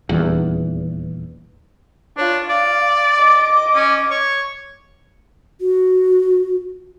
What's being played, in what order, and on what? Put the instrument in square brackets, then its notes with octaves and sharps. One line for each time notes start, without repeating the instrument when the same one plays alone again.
[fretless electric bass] D#1 E2
[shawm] D4 [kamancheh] F4 C#5
[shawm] D5 [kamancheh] F5
[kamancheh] D#5 D6
[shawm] C#4
C#5
[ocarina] F#4